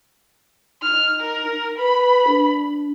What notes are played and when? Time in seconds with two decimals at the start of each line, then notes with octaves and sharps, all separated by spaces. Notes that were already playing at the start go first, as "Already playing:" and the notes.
0.82 D#4 F6
1.20 A#4
1.78 B4 B5
2.27 D4